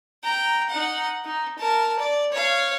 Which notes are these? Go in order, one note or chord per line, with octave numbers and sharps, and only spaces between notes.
G5 A#5
D#4 F#5
D#4
A#4 A5
D5
C#5 F5